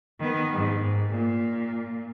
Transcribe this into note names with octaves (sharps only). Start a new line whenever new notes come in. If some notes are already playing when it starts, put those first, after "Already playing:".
D#3 B3
G#2
A#2